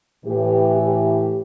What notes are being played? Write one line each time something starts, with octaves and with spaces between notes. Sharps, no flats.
A2 E3 G4
G4